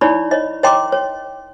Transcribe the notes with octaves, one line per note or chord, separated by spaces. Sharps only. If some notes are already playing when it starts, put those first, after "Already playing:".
D#4 E4 C#5 D5 B5 C#6
C#5 D#5
C#5 D#5 G5 A#5 C6 D6
C#5